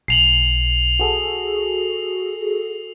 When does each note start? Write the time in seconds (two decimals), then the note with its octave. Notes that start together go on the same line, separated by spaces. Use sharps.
0.08 B1 C7 F7 F#7
0.99 F#4 G#4 A4